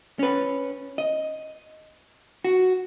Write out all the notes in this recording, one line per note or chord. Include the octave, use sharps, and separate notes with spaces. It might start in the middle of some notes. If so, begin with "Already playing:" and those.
C#4 B4
D#5
F#4